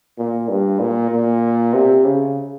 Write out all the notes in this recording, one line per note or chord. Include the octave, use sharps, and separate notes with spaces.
A#2
G2
A#2
A#2
C3
C#3